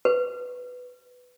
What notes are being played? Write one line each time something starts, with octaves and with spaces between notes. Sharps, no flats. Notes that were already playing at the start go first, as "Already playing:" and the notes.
B4